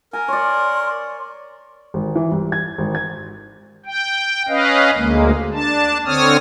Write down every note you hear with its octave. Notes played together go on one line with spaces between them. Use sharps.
A#4 G#5
C#5 D5 C6
G#1
E3
C2
G#6
G#1
G#6
G5
C#4 B4 D#5 F5
D2 G#3 A#3
D4 A5
D3 C4 C#5 D#6 F6